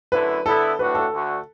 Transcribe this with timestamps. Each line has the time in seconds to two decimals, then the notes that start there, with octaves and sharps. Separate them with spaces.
0.12 F#2 D3 A3 E4 B4
0.45 D3 B3 E4 A4
0.79 A2 A3 D4 F#4 B4
0.95 A4
1.11 D2 D3 A3 F#4